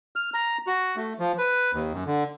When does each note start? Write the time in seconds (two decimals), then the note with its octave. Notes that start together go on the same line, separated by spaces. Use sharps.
0.16 F6
0.34 A#5
0.67 F#4
0.96 A3
1.19 F3
1.38 B4
1.74 D#2
1.93 F#2
2.06 D3